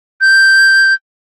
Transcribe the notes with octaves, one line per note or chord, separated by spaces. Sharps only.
G6